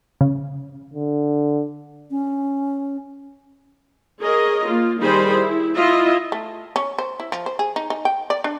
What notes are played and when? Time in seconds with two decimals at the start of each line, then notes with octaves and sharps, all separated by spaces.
0.21 C#3
0.94 D3
2.11 C#4
4.21 G#4 A#4 C#5 D#5
4.65 A#3 F4
5.00 D#3 G3 D#4 G#4 C5 B5
5.32 E4
5.75 E4 F4 D#5 E5
6.32 A3
6.76 C#4
6.98 C5
7.20 E4
7.32 F3
7.46 C5
7.59 G#4
7.76 D#4
7.90 D#4
8.05 G5
8.30 D5
8.44 D4